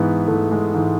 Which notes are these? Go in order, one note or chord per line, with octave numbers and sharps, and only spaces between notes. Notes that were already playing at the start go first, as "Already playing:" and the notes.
Already playing: G#2 E3 B3
G#2 E3 A3
G#3
G#2 E3